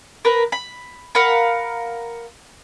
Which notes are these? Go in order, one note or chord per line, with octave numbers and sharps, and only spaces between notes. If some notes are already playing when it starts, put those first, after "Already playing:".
A#4 B4
B5
A#4 F5 F#5 B5